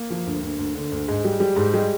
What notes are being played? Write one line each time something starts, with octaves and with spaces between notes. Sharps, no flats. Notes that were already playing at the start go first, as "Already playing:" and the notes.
Already playing: A#3
F3
D2
D2
D2
D3
D2
G#2 G#3
G3
G3
G#2
G3 G#3